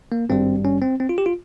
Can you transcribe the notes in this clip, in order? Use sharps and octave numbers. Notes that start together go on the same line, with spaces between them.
A#3
G#1 G2 G3 C4
C#4
C4
C4
F4
G4
F4